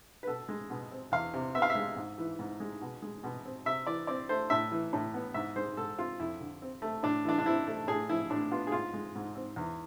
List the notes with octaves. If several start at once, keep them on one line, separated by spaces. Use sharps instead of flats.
B4
B2 A4
G#3
B2
C4
E2 F5
C3
B3 E5
F5
E5
G#3
G#2
E3
G#2
G#3
B2
G#3
B2
C4
C3 E5
E3 D5
C4 D5
A3 C5
A2 E5
E3
A2
B3
G#2 E5
G#3 C5
G#2 A4
C4 F4
F2 E4
D3
C4
A3
A2 D4
E3 D4
D4
C4 E4
A3
A2 G#4
F3 E4
A2 D4
B3 F4
G#4
G#2 F4
G#3
G#2
C4
E2